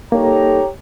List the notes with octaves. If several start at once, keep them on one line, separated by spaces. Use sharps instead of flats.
G3 A#3 D#4 G4 A4 C#5 A#5